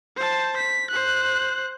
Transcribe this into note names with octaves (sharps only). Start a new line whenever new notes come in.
C5 A5
B6
C5 F#6